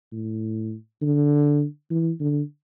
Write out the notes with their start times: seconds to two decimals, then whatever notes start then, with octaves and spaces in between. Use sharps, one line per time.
0.12 A2
1.02 D3
1.90 E3
2.20 D3